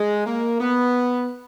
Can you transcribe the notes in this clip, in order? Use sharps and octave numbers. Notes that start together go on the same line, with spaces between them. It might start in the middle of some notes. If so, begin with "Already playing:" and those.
Already playing: G#3
A#3
B3